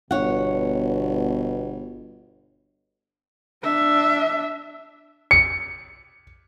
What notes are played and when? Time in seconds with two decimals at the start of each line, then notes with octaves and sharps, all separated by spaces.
0.11 G1 B2 C#5 F#5
3.64 D4 E5
5.31 C#7